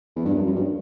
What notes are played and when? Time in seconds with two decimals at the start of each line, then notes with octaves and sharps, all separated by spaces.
0.16 E2
0.25 G2
0.35 F#2
0.47 F#2
0.55 G2